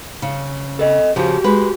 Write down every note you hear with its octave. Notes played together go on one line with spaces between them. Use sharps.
C#3
A4 D#5
C#3 F3 F#4 G4
G#3 B4